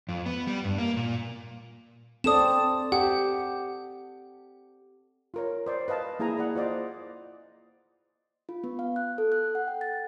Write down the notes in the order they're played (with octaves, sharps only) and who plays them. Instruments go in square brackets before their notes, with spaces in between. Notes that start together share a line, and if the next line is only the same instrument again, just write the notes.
[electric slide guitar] F2
B3
G3
G2
A#3
A#2
[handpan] C4 A4 D5 [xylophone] D#6 E7
[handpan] G4 [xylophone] F#5
[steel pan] F4 A#4 C#5
C5 D5
B4 D#5 F5 A5
A#3 E4 G#4 G#5 A#5
G#4 D5 F#5
F4 C5 D5 D#5
[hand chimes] F4
B3
F5
F#6
A4
F#6
F#5
G5
A6